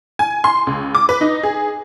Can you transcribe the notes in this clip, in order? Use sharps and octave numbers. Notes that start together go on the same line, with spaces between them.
G#5
C6
C#2
D6
B4
D#4
G#4